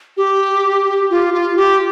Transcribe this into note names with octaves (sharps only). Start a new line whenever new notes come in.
G4
F4
F4
G4